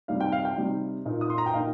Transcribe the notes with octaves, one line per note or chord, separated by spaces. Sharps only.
C3 G3 D#4 F5
G5
F5
G5
C3 G3 D#4
A#2 A#3 D#4
D#6
C6
A#5
G5
A#2 A#3 D#4 F5